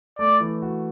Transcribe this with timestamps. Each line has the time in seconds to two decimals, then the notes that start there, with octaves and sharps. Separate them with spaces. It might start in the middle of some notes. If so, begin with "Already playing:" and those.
0.18 A3 D5
0.40 E3
0.62 F#4